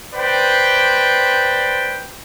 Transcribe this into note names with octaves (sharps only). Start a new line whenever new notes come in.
B4 C5 D5 G5